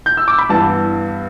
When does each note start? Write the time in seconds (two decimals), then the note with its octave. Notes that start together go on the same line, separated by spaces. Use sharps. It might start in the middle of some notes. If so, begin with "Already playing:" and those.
0.06 G6
0.17 E6
0.28 D6
0.38 B5
0.49 G2 E3 B3 A5